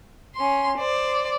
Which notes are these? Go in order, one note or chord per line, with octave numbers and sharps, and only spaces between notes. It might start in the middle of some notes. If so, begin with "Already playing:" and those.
C#4 C6
C5 D5